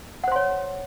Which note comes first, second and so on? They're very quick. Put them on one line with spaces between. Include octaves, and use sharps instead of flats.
F#5 C5 C6 C#5